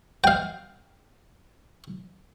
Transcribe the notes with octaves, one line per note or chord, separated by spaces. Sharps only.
F5 G5